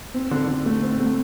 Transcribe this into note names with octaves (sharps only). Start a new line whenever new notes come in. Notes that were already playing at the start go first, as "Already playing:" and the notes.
C4
D3
D3
A3
C4
A3